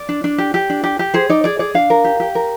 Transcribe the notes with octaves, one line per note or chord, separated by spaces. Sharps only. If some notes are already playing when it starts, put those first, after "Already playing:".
Already playing: D5
D4
D4
G4
G4
D4
G4
G4
G#4 C5
D#4 D5
G#4 D5
G#4 D5
D4 F5
A#4
G4
G4
A#4